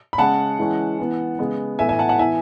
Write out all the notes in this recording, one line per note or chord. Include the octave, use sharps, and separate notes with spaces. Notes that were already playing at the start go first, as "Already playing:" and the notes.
B5
C#3 G#3 C#4 F#5 A5
E3 G#3 C#4
E3 B3
C#3 G#3 B3
A2 E3 B3 E5 G#5
E5 G#5
F#5 A5
F#5 A5
E3 B3 E5 G#5